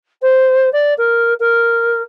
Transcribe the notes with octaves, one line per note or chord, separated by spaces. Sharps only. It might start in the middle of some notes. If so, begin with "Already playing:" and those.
C5
D5
A#4
A#4